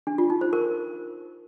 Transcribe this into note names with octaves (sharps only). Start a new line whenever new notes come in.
D4
F4
D#4
C5
A#4